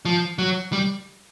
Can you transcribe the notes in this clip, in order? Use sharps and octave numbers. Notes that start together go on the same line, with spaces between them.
F3
F#3
G3